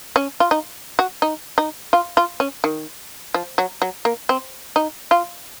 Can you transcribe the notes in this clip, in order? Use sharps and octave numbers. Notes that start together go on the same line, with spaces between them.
C#4
F4
D#4
F#4
D#4
D#4
F4
F4
C#4
D#3
F3
F#3
F#3
A#3
C4
D#4
F4